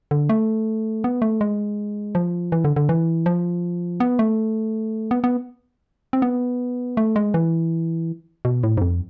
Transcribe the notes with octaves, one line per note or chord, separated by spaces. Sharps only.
D3
A3
B3
A3
G#3
F3
E3
D3
D3
E3
F3
B3
A3
B3
B3
C4
B3
A3
G#3
E3
B2
A2
G#2
F2